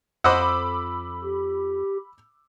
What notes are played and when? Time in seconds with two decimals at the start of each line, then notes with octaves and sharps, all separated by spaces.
0.24 F2 C5 D#5 F#5 B5 D6 E6
1.23 G4